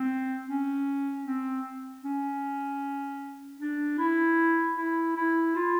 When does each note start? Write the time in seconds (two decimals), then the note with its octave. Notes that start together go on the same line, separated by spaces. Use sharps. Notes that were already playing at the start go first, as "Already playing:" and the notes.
Already playing: C4
0.47 C#4
1.26 C4
2.04 C#4
3.60 D4
3.99 E4
4.77 E4
5.16 E4
5.56 F4